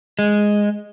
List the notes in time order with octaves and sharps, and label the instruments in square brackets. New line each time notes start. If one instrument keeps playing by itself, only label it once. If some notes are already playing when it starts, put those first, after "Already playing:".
[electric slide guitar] G#3